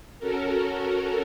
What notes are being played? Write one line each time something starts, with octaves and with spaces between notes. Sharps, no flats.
C#4 F#4 A4 A#4